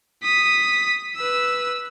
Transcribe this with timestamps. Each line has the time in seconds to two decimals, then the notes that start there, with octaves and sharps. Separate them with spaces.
0.23 D#6 B6
1.16 B4 E6